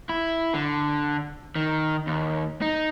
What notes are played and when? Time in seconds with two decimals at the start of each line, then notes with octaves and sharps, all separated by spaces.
0.09 E4
0.54 D3
1.56 D#3
2.07 D#2
2.62 D#4